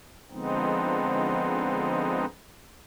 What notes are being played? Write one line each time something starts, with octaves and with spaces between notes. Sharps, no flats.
D3 F3 G#3 B3 C4 D#4